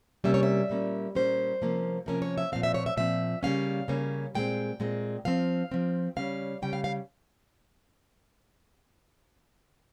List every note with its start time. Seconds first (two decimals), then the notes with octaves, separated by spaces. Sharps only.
0.24 C3 G3 A#3 C#4 E5
0.34 C#5
0.43 E5
0.70 A#2 G3 A#3 C#4
1.15 A#2 G3 A#3 C#4 C5
1.62 C3 F3 A#3 C#4
2.06 C3 F3 A#3 C#4 A#4
2.22 C#5
2.38 E5
2.52 A#2 F3 C4 F5
2.63 E5
2.74 C#5
2.86 E5
2.97 A#2 F3 C4 E5
3.43 C#3 G3 A#3 C#4 F5
3.88 C#3 G3 A#3 C#4
4.35 A#2 G#3 C4 G5
4.80 A#2 G#3 C4
5.25 F3 C4 F5
5.71 F3 C4
6.16 C#3 G3 C#4 F5
6.62 C#3 G3 C#4 G5
6.73 F5
6.84 F5